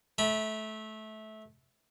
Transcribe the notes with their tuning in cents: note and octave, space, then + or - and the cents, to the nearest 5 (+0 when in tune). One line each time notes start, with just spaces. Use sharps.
A3 -20 B5 -30